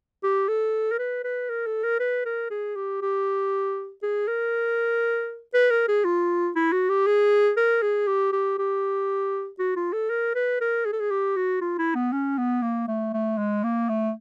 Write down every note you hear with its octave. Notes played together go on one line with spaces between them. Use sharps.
G4
A4
A#4
B4
B4
A#4
A4
A#4
B4
A#4
G#4
G4
G4
G#4
A#4
B4
A#4
G#4
F4
E4
F#4
G4
G#4
A#4
G#4
G4
G4
G4
F#4
F4
A4
A#4
B4
A#4
G#4
A4
G#4
G4
F#4
F4
E4
B3
C#4
B3
A#3
A3
A3
G#3
A#3
A3